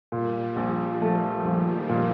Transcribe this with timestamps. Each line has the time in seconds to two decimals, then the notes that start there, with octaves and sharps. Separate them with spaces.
0.12 A#2 G3
0.56 A#1 F3
1.01 G3 A3
1.45 A#1 D#3
1.89 A#2